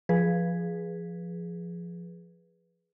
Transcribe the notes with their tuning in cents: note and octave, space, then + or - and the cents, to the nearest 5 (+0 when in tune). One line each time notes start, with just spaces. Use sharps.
F3 -5 G#4 +0 B4 -5